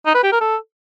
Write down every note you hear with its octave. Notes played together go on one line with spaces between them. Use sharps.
D#4
B4
G4
A#4
A4